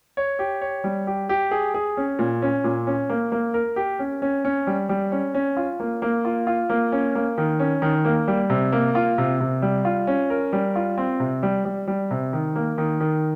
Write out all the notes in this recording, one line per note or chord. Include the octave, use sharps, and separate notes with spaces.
C#5
G4
C#5
G3
G4
G4
G#4
G#4
C#4
A#2
C#4
A#2
C#4
A#3
A#3
A#4
G4
C#4
C#4
C#4
G3
G3
C#4
C#4
F4
A#3
A#3
F4
F4
A#3
C#4
A#3
D#3
C#4
D#3
A#3
G3
C3
A#3
F4
C3
C3
G3
F4
C#4
A#4
G3
F4
C4
C3
G3
G3
G3
C3
D#3
A#3
D#3
D#3